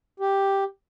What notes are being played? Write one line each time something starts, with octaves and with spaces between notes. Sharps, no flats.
G4